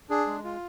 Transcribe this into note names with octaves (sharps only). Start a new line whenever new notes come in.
D4 G#4
G#3
F4